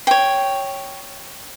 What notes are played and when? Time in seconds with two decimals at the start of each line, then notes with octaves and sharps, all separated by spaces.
0.07 C#5 G5